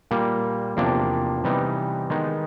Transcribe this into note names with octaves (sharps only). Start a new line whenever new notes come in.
A#2 G3 A#3
E2 C3 F3 A#3 D4
C3 E3 G3 B3 D#4
D#3 G#3 B3 D#4